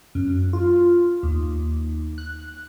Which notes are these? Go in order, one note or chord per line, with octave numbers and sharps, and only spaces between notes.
F#2
F4
D#2
F#6